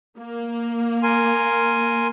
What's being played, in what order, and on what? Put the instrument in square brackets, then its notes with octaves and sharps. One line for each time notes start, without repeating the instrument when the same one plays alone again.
[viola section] A#3
[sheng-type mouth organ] A#4 G#5 C6